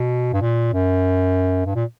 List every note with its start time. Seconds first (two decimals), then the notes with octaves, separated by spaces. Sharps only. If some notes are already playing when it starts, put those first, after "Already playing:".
Already playing: B2
0.33 G2
0.42 A#2
0.73 F#2
1.66 G2
1.75 A#2